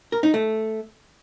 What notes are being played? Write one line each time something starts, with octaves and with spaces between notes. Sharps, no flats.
A#4
D#4
A3